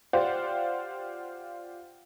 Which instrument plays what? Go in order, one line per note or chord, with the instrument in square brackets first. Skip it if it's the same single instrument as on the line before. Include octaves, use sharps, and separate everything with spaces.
[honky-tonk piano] F4 G4 C5 D5 F5 F#5